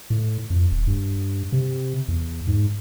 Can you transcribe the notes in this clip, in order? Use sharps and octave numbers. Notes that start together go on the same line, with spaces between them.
A2
F2
D#1
G2
C3
E2
G#2